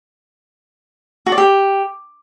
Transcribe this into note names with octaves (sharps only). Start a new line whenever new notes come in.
F#4
D5
G4